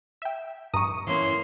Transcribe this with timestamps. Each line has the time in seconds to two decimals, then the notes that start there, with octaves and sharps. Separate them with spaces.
0.22 E5 G5
0.74 G2 A#5 C#6 D#6 D#7
1.07 E3 A#3 C#4 C6